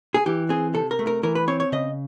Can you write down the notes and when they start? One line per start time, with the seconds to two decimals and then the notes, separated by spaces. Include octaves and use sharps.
0.14 G#4
0.26 E3 G4
0.49 C4 G#4
0.74 C3 A4
0.91 A#4
0.99 A3
1.07 A#4
1.23 E3 A#4
1.35 B4
1.48 C4 C#5
1.60 C#5
1.72 C#3 D#5